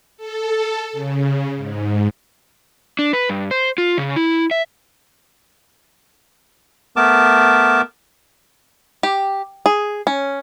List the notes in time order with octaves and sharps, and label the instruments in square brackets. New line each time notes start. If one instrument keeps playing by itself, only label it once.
[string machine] A4
C#3
G#2
[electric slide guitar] D4
B4
G2
C5
F4
C#3
E4
E5
[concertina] A3 B3 A#4 A5 D6
[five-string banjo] G4
G#4
C#4